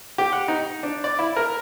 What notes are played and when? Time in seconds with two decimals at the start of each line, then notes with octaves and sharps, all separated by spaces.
0.18 G4
0.33 F#5
0.48 D#4
0.83 D4
1.04 D5
1.19 E4
1.37 A#4